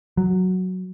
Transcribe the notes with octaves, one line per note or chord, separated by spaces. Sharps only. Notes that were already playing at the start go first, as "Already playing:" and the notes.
F#3